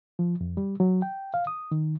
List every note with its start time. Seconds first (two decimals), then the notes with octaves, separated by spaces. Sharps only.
0.19 F3
0.41 F2
0.57 G3
0.80 F#3
1.02 G5
1.34 F5
1.47 D#6
1.71 D#3